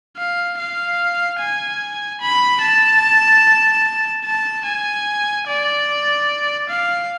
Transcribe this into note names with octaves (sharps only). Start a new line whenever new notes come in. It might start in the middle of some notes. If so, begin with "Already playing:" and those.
F5
F5
G#5
B5
A5
A5
G#5
D5
F5